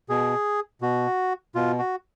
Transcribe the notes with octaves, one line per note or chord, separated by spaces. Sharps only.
B2 G#4
B2 F#4
B2 F4
F#4